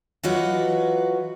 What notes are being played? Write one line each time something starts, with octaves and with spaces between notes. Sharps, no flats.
E3 F#3 F4 F#4 B4 D#5